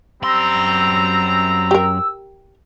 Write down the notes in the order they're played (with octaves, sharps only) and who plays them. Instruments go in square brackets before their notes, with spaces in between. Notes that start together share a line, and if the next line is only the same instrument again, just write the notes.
[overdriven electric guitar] F#2 C6 [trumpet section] G3 C4 A#5 [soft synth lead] E6
[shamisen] G4 A#4